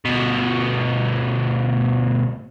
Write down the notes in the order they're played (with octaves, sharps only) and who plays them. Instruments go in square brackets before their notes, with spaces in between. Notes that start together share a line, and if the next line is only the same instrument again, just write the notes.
[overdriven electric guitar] D2 B2